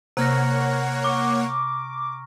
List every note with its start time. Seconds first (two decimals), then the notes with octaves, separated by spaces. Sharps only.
0.17 C3 A#3 C#5 F#5 A#5 F6 A#6
1.04 C#6 D6